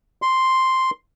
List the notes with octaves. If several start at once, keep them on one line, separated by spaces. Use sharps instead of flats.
C6